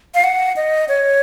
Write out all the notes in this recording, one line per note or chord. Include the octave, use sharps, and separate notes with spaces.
F5
F#5
D#5
C#5